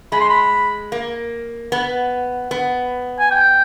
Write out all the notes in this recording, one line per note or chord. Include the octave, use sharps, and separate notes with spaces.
G#3 B5
C6
B5
A#3
B3
B3
G#5
G5